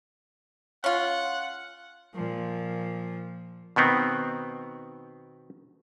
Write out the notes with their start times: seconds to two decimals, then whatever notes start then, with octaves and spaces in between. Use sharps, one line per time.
0.84 C#4 F4 F#5
2.14 A#2 F3
3.76 B2 D#3 B3 C4